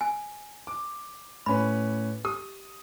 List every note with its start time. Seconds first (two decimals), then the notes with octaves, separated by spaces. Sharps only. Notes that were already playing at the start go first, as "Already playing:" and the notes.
0.01 G#5
0.67 D6
1.46 A2 C#4 B4 B5
2.25 G4 D#6